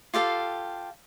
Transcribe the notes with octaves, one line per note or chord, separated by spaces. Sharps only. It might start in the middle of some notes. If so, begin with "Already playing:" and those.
F4 G4 A4 F5